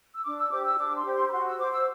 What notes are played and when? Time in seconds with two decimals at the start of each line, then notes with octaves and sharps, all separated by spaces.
0.14 E6
0.24 D4 D6
0.38 E6
0.51 G4 C5 D6
0.64 E6
0.78 D4 D6
0.96 C6
1.05 G4 C5
1.14 C6
1.28 B5
1.31 F#4 C6
1.45 E6
1.59 C5 D6
1.72 E6